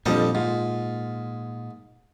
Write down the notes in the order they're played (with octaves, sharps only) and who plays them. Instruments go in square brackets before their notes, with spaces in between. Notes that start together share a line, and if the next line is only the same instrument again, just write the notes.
[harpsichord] F2 A4 D#5 [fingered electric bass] A#2 [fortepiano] D3 F3 G3
[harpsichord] G#2 [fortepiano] F4